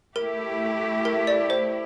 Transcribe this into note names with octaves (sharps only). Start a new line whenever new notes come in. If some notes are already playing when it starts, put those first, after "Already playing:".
A3 E4 G4 A#4
A#4
D5
C5